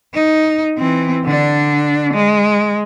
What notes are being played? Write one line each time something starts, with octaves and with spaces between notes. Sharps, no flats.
D#4
E3 C4
D3 D4
G#3